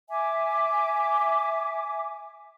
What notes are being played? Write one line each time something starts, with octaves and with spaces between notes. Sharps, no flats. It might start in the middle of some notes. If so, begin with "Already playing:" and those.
E5 G#5 D6